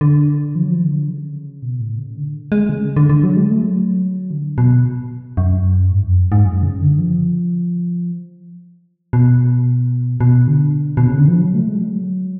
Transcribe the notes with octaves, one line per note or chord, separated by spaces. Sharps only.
D3
F3
F#3
F3
D3
C#3
B2
A2
C#3
D3
G#3
C#3
D3
D3
F#3
G#3
A3
F#3
D3
B2
F#2
G#2
F2
F#2
G#2
F#2
C#3
D3
F3
B2
B2
D3
B2
C#3
D3
F3
F#3
A3
G#3
F#3